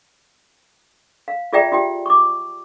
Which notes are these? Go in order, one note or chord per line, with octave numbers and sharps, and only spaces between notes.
F5
F4 G#4 D5 E5 G5 A#5
F4 G4 G5
C#6 D6